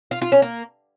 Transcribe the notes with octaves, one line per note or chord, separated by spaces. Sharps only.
F4
F4
C#4
A#3